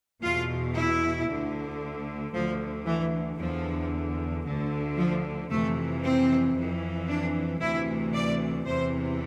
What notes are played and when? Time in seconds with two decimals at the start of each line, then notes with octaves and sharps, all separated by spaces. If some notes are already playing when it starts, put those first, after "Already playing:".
0.23 E2 B2 F4
0.75 E4
1.29 D2 D3
2.33 D2 D3 F3
2.86 E3
3.39 E2 D3 F3
4.45 D2 D3
4.97 F3
5.50 F2 C3 E3 A3
6.03 C4
6.56 F2 E3
7.08 D4
7.61 D2 C3 E3 E4
8.13 D5
8.67 E2 C3 E3 C5